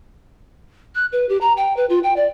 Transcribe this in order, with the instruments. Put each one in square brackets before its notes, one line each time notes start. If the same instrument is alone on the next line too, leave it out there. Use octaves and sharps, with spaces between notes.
[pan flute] F#6
B4
G4
A#5
G5
B4
F4
G5
D5